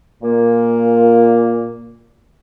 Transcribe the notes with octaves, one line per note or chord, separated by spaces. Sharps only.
A#2 A#3